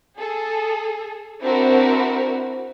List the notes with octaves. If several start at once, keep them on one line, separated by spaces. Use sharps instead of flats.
G#4 A4
C4 D4 E4 F#4 A#4